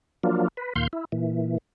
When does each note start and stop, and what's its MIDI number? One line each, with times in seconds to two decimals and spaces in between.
0.23 0.48 53
0.23 0.48 54
0.23 0.48 58
0.23 0.48 62
0.23 0.48 65
0.57 0.73 71
0.76 0.87 39
0.76 0.87 46
0.76 0.87 77
0.76 0.87 84
0.76 0.87 91
0.93 1.05 64
1.12 1.58 46
1.12 1.58 52